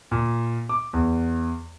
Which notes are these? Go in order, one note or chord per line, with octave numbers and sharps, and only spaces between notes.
A#2
D6
E2